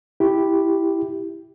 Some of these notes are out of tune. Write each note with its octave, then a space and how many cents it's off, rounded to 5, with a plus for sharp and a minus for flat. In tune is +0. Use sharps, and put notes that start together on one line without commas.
E4 +0 G4 +0